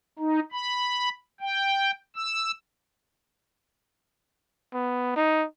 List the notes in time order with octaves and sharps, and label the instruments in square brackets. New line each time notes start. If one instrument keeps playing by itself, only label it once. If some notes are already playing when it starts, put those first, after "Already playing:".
[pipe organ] D#4
B5
G5
E6
[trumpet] B3
D#4